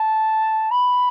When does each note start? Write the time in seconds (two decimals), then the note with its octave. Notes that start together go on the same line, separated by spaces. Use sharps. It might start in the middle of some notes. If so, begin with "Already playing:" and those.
Already playing: A5
0.71 B5